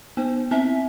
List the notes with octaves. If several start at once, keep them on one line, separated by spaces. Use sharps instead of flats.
B3 C5
C4 E5